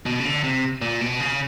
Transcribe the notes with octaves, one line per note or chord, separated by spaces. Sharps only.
B2
C#3
D3
C3
A#2
B2
C#3